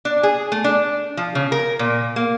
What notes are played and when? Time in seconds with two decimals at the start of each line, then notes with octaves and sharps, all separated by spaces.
0.05 D4
0.23 G#4
0.52 A3
0.64 D4
1.17 F3
1.35 C#3
1.52 A#4
1.79 A#2
2.16 A#3